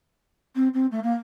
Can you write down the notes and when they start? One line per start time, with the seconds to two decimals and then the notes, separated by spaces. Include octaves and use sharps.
0.55 C4
0.73 C4
0.91 A3
1.03 A#3